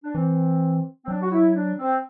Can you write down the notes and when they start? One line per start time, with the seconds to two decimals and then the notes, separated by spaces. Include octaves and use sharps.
0.04 D4
0.15 E3 C4
1.04 C4
1.08 F#3 D4
1.22 F#4
1.32 E4
1.55 D4
1.78 C4